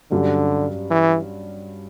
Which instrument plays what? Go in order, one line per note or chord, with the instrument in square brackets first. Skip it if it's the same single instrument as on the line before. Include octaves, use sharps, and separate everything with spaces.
[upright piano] G2 F#3 C#4 [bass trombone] D3
[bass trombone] E3